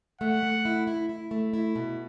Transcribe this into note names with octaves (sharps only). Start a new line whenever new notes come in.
A3 F#5
A3
E4
E4
E4
A3
E4
B2